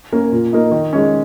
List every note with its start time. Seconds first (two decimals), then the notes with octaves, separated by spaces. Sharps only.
0.12 A#3 C#4
0.32 A#2
0.53 A#3 D#4
0.72 D#3
0.93 G#3 C#4